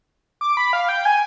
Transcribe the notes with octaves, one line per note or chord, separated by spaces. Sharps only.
D6
B5
F5
G5
G#5